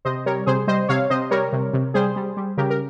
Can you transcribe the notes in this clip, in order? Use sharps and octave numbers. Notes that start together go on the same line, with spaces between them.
C3 C5 D#5
G3 A#4 C#5
C3 G#4 C5
G3 C5 D#5
C3 C#5 F5
C3 C5 D#5
G3 A#4 C#5
C3
C3
G3 G#4 C5
G3
G3
C#3 G4 A#4
A#4